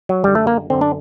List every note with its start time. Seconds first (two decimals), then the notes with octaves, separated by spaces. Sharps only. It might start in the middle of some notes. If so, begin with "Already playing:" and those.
0.09 F#3
0.24 F#2 D3 G3
0.35 A3
0.47 A#3
0.70 F#2 D3 C4
0.81 D4